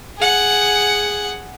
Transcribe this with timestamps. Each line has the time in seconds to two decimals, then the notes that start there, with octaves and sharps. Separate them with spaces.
0.18 G#4 F#5